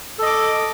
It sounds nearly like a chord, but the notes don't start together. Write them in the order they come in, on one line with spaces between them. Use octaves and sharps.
A4 D#5 D6